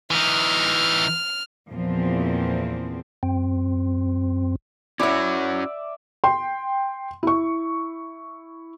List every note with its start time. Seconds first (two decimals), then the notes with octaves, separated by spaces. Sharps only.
0.11 E3 D#4 F6
1.70 E2 A#2 F3 C4
3.23 F#2 C4
4.99 C#4 E4 F#4 C#5 D5 E5 F#5
6.24 G5 C6
7.23 E4 C#6